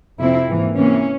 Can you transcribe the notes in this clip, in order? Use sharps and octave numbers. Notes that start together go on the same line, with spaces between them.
F2 C3 F3 C4 E4
G#2 E3 A#3
C3 E3 A#3 C#4